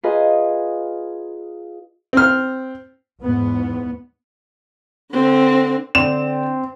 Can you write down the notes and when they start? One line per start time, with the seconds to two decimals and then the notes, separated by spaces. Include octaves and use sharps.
0.03 F4 G#4 B4 D#5 A#5
2.13 C4 F6
3.22 E2 G#2 B3
5.13 D3 C4
5.95 D3 C4 D5 E7